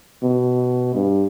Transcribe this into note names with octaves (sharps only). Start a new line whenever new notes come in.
B2
G2